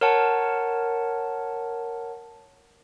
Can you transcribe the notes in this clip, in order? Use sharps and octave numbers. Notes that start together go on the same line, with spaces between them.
A#4 C#5 F#5 A5